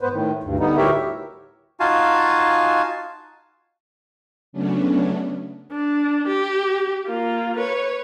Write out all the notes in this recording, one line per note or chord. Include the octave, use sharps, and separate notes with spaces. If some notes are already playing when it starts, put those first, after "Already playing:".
G#2 B3 B4 C5
A2 D#3
D2 G2
D3 G3 B3 D#4
D2 A2 G4 A#4 C#5 E5
D#4 F4 F#4 F5 G#5 A5
C#3 F#3 A3 B3 C#4 D4
D4
G4
A#3 F4
B4 C#5